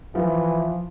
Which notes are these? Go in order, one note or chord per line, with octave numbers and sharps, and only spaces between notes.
E3 F3